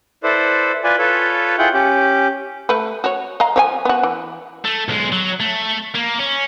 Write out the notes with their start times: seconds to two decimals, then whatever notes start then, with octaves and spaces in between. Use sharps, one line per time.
0.23 E4 A4 B4 C5 D5
0.84 F4 B4 D5 G#5
0.99 F4 A4 B4 C#5
1.58 E4 F4 G#4 F#5 G5
1.74 C#4 G4
2.69 A3 B4
3.04 F#4 C#5
3.40 D#5 F5 A#5
3.56 F3 C#5 G#5
3.85 B3 F#4
4.03 E3
4.65 A3
4.88 B1 G#3
5.12 F#3
5.40 A3
5.94 A#3
6.19 C#4